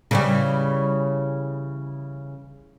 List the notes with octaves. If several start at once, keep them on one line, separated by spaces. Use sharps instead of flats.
C#3 E3 G3